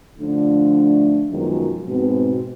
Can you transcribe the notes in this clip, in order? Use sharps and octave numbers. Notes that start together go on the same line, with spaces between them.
D3 F3 A3 D4
F#2 B2 D#3 F3 F#3 G#3
G#2 B2 C4